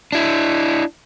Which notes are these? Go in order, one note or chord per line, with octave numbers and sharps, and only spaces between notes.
D4 E4